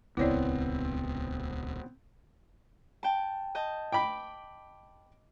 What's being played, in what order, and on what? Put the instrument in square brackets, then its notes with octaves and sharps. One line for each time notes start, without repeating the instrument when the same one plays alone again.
[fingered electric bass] D#1 C#2 [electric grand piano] B3 C4 [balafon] E4 C#5 D5
[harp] G5 A5
D#5 A5 G6
[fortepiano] G5 B5 [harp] D6